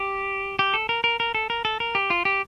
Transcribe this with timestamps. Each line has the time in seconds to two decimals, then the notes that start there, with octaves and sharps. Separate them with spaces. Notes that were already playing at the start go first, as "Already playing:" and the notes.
Already playing: G4
0.59 G4
0.74 A4
0.89 A#4
1.04 A#4
1.20 A#4
1.35 A4
1.50 A#4
1.65 A4
1.80 A#4
1.95 G4
2.10 F4
2.25 G4